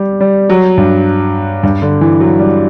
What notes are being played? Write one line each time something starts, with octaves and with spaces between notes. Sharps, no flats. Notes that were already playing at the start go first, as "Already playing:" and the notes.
Already playing: G3
G3
F#3
G2
G2
D3
E3
F#3
G3